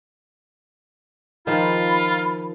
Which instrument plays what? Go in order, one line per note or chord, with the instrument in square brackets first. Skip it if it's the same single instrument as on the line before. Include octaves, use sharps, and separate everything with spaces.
[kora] D#3 F3 G#4 [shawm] F4 [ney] B5